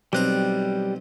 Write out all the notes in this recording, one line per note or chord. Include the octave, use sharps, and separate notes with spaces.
B1 G3 C4 A#5 F#6